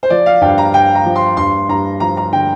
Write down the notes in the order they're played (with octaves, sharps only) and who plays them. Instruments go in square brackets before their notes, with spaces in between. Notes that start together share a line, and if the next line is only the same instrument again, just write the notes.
[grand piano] C5
F3 D5
F5
G2 G5
A#5
G2 G5
A#5
F3
C6
G2 C6
G2 A#5
F3 A#5
A#5
D3 G5